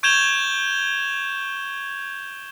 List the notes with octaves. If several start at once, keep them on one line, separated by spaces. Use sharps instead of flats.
C#6 G6 G#6 E7 F7 G7